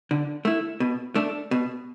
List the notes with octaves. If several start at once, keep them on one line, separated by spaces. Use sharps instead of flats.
D3
A3 E4
B2
A3 D4
B2